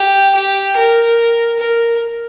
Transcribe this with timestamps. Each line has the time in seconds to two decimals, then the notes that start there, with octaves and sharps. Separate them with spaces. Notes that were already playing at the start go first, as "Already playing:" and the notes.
Already playing: G4
0.35 G4
0.77 A#4
1.60 A#4